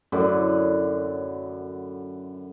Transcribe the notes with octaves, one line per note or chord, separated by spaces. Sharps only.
F#2 A2 D3 B4